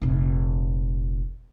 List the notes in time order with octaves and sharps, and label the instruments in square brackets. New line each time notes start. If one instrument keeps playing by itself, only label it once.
[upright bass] F1 A#1